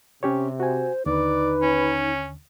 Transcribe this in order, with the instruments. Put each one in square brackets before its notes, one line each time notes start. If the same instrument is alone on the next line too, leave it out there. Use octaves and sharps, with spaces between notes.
[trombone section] C3 [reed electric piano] C#4 G4 C#5
[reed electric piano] F#4 G#5 [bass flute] C5
[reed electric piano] D#2 D3 [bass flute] D#4 [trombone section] B4 [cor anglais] D5
[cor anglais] C#4